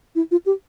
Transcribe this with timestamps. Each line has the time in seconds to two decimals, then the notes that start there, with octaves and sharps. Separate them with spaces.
0.15 E4
0.31 F4
0.46 G4